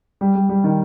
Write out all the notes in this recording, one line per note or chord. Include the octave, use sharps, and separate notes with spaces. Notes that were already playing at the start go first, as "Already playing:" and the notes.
G3
G3
G3
D#3